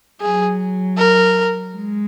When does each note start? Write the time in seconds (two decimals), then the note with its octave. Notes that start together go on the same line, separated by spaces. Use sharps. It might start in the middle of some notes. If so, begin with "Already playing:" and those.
0.21 F#3 G#4
0.98 A#4
1.74 G#3